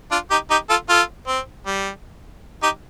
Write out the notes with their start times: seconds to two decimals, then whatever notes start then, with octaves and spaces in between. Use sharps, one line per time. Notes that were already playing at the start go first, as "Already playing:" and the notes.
0.11 D4 F4
0.31 D#4 G4
0.51 D#4 G4
0.70 F4 A4
0.89 F4 A4
1.28 C4
1.66 G3
2.63 D#4 G4